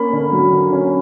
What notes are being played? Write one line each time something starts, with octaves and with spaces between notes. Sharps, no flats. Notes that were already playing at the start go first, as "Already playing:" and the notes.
Already playing: A#3 C#4 B5
D3
F#3
D3
C#4